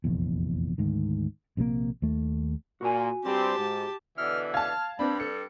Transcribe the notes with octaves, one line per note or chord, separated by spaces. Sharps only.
F1 A#1 E2
D2 G#2 D#3
A#1 C3 D#3 A#3
D#2 A3
A#2 F#4 G#5
G2 G3 C4 G4 A5
G#2
B2 D3 E3 F6
F5 A5 F6 G#6
G2 G3 C4 D4 B5
A4 C#7